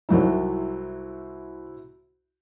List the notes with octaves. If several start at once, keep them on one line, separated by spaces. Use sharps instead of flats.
C2 F#3 D#4 E4 F#4 C5